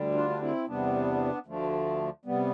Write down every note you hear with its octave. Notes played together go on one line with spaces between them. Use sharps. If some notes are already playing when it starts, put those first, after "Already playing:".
Already playing: D2 D3 G3
D4 F4
D4
C4 E4
E2 C3 G3 B3 D4
D2 D3 F3 A3
C3 G3 B3